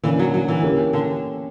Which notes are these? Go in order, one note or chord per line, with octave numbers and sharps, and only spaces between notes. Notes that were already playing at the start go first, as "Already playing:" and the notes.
D3 E3 A#3 C#4
F#3
F#3
E3
E3 A#3 C#4 G4 A#4
D3